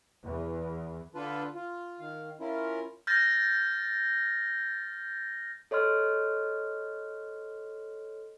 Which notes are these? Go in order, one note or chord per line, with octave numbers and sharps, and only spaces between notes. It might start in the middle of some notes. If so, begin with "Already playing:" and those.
E2
D3 D4 F4 A4 B4
F4
D#3 F5
C#4 E4 F4 A#4
F6 G6 A6 A#6
A4 C#5 D#5 C6 F6